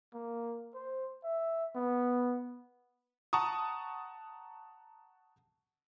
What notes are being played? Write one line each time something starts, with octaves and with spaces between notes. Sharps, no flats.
A#3
C5
E5
B3
F#5 A5 A#5 C#6 D#6